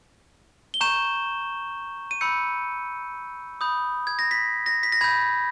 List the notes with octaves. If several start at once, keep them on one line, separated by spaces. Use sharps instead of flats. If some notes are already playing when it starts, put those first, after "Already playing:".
G7
A#5 C#6 G6 E7
D#7
B5 E6 G6 C#7
B5 D#6 G6
G#6
A#6
B6
A#6
B6
A#6
B5 G6 G#6